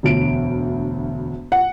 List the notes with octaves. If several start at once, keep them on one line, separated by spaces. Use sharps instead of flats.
E1 D2 D7
F#5